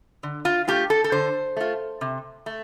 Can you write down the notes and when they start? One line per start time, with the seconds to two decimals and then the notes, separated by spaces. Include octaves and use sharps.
0.23 D3
0.45 F4
0.67 A3 F4 G4
0.90 A4
1.04 A4
1.12 D3 C5
1.56 A3 F4
2.01 C3
2.46 A3